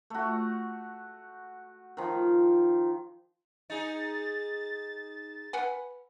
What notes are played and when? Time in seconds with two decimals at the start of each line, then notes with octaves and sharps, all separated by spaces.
0.10 A3 F#4
1.97 D#3 F3
3.70 D#4 G#4 A6
5.53 B4 F#5 G#5